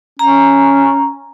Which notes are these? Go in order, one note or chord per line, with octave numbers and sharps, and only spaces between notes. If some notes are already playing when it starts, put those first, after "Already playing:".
C#4 A#5